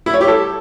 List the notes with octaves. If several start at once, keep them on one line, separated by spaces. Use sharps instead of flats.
E4
C#5
G4
A4